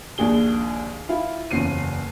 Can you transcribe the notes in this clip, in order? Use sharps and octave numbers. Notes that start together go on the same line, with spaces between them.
A#1 D#2 D4 G#4 G7
E4 F4 F5
F#1 E2 C#4 C7 D#7